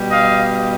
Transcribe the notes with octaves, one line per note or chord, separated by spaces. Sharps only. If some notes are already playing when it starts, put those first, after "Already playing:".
Already playing: B2 G3
D#5 F5